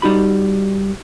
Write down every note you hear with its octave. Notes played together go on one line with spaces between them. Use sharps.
G3 D#4 F#4 B5